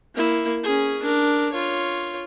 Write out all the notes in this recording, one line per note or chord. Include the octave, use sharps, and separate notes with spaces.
A#3 E4
C#4 G#4
D4 A#4
F4 C#5